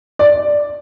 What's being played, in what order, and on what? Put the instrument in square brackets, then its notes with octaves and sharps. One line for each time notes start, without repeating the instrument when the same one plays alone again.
[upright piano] D5